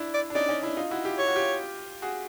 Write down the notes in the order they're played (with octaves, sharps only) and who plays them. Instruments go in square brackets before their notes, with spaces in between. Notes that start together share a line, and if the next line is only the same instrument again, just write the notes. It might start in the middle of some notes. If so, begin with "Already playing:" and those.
Already playing: [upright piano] D4 E4
[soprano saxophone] D5
[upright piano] D4
[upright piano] C#4 D#4 [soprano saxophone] D5
[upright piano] C#4 D#4
D4 E4
D#4 F4
E4 F#4
F4 G4
[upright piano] G4 [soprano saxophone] C#5
[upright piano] F#4
F4 G4
F#4 G#4